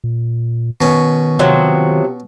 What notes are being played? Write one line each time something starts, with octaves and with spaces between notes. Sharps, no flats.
A#2
B2 D#3 C#4
C3 D#3 F3 F#3